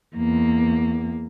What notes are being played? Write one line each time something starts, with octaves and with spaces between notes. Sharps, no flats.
E2 A#3